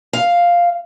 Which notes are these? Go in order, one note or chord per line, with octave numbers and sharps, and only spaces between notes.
F5